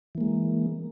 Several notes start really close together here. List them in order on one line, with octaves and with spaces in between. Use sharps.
E3 A#3 G#3